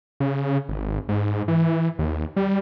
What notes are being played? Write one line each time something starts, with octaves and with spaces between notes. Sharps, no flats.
C#3
G#1
G#2
E3
D#2
G3